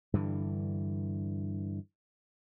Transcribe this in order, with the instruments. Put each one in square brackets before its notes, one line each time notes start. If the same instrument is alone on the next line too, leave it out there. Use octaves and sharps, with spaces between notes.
[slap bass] G2 D3 E3